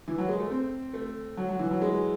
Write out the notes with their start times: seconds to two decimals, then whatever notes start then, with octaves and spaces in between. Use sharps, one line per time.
0.08 E3
0.18 F#3
0.29 G#3
0.40 A3
0.51 C4
0.94 A3
1.37 F#3
1.49 F#3
1.59 E3
1.70 F#3
1.82 G#3